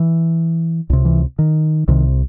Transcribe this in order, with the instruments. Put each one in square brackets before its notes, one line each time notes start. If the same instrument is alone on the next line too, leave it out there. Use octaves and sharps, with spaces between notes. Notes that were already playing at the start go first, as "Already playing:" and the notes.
Already playing: [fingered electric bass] E3
C#2 C3
E3
D#3
C2 C3 D#3